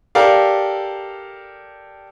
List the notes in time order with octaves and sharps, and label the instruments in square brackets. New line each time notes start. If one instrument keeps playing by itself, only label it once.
[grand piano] G4 A4 A#4 D5 F5